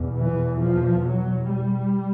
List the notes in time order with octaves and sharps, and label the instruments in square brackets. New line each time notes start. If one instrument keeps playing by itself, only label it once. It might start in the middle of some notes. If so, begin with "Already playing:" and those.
Already playing: [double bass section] E2 B2
E3
F3
F#3
G3